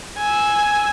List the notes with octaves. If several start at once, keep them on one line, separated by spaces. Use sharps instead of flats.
G#5 E6